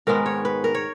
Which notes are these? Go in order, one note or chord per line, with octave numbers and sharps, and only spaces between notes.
G#2 D#3 G#3 B3 A#4
C#5
B4
A#4
C#5